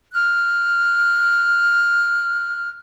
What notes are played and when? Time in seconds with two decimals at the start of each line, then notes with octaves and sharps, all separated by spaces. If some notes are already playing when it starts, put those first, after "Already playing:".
0.12 F6 F#6